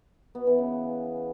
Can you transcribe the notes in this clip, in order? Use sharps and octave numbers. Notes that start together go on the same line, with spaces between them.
B3
E3
C#3